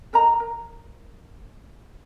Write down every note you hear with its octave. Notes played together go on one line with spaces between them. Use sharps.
A4 A#4 D#5 A#5
A#4